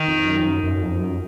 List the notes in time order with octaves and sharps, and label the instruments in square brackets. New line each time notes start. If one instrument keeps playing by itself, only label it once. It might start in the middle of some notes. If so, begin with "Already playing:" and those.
Already playing: [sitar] D#3
[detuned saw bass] F2
F#2
F2
F#2
F#2
F2
F#2